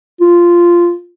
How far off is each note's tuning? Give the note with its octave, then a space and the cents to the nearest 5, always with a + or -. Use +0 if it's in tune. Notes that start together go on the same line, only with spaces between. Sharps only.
F4 -10